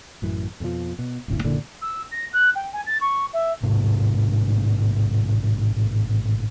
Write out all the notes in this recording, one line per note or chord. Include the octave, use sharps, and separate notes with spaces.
A1 F#2 E3
F2 B2 D#3 F3
B2
D1 G1 C#3 E3
F#1 A#2 D3 E3
E6
A#6
F#6
G5
G#5
A6
C#6
E5
A1 G#2 C3